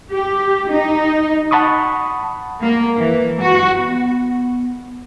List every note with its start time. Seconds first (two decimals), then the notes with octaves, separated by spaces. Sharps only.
0.12 G4
0.70 D#4
1.51 F#5 A5 B5 C#6 D#6
2.60 A#3
2.98 E3
3.42 F#4
3.78 B3